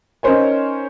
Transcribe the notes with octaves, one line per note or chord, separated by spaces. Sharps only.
C#4 D#4 A#4 C5 C#5 G#5